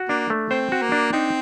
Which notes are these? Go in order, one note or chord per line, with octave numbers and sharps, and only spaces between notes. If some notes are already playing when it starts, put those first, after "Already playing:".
Already playing: F#4
A#3 D4
A3
C4 C5
F#4
A#3
D4
C4 D#4